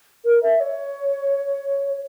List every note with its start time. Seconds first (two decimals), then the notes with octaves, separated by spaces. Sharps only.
0.25 A#4
0.43 E5
0.60 C#5